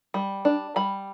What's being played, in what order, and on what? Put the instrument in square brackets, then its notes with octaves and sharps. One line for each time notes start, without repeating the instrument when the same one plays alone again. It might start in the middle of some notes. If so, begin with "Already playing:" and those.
[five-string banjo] G3
D4
G3 B5